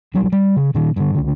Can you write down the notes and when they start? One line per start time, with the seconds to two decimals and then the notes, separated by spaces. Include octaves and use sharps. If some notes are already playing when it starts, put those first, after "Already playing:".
0.14 B1 F#3 G3
0.32 G3
0.56 C#3
0.74 A#2 D#3
0.96 G2 D3
1.15 C#2 D3